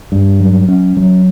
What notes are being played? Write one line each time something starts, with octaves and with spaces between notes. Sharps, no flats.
G2
F#3
C#4
F#3